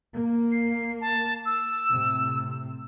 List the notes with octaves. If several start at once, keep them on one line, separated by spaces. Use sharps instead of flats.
A#3
C7
A5
E6
A2 C3